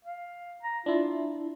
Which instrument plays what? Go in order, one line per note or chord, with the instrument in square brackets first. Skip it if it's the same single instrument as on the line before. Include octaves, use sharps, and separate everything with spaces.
[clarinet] F5
A#5
[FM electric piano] D4 E4 [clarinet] F4